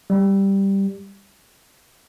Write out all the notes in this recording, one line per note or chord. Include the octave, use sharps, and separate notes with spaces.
G3